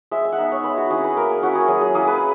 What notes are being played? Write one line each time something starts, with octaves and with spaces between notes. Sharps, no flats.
G#3 E5
G#5
F#5
B3 D#4 E5
C#5
G#3 B4
F#4
C#4 E4 G#4
B4
A#3 A#4
G#4
C#4 E4 F#4
G#4
F#3 G#4
G#4
A#3 E4 G#4
B4